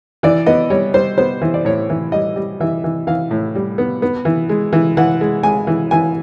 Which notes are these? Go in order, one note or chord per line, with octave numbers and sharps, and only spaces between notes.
E3 D5
B3 D#5
G3 C#5
G3 C5
B3 C5
E3
D5
A2 C#5
E3
G3 D#5
G3
E3 E5
E3
E3 F5
A2
G3
B3
B3
E3
G#3
E3
E3 F#5
G#3
G#3 G#5
E3
E3 G#5